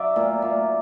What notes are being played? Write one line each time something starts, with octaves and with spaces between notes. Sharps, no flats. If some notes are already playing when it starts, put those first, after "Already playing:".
Already playing: F#3 D5 E5
A#2
A#2